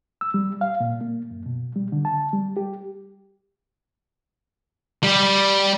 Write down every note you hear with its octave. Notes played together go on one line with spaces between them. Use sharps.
E6
G3
F5
A#2
A#3
F#2
B2
G3
D3
A5
G3
G4
G3